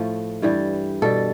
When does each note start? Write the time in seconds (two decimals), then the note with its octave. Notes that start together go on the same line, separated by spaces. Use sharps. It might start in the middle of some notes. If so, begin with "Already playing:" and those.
Already playing: A2 F3 A3
0.42 G2 E3 G3
1.02 B2 G3 A4